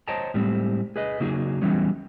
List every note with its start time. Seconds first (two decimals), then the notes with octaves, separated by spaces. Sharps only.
0.08 C5 C#5 D#5 G5 A5 A#5
0.34 A2 G3 G#3 C4
0.96 G#4 B4 D#5
1.20 C#3 F#3 A#3 D#4 F#4 G#4
1.61 E3 F#3 G3 B3 C#4 D#4